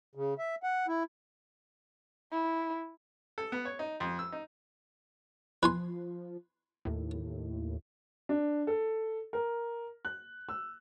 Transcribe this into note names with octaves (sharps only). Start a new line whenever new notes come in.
C#3
E5
F#5
E4
E4
A4
B3
C#5
D#4
F2
E6
D#4
F3 B4 G#5 C6
D#2 A2
D4
A4
A#4
F#6
E6